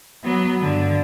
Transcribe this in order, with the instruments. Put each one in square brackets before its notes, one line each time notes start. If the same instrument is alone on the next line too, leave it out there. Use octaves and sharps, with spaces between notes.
[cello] F#3 B3
G2 D3